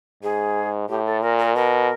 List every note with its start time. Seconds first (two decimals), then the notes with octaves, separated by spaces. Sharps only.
0.23 G#2 G#4
0.89 A2 G4
1.06 A4
1.22 A#2 A#4
1.38 A#4
1.55 B2 A#4